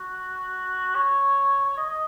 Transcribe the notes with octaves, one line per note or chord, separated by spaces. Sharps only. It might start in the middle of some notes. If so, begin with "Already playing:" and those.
Already playing: F#4
C#5
C#5
D#5
D#5